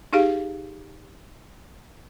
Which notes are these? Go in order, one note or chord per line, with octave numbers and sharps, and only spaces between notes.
D#4 G4 G#4 F5